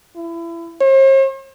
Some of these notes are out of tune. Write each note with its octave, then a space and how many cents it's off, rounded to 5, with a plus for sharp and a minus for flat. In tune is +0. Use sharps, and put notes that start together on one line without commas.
E4 +30
C5 +45